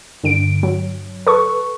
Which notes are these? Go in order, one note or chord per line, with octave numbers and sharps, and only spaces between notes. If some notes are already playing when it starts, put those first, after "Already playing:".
G2 D3 D7
F#3
A4 B4 C#6